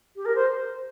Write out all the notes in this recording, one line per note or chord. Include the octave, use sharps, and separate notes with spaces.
G4
A#4
C5